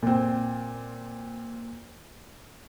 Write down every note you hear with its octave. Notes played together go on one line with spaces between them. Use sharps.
A#2 C4